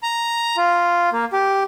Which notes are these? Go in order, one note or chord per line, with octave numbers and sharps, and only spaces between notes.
A#5
F4
A#3
G4